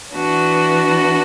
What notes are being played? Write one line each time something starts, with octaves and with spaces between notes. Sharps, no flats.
E3 B3 D4 F#4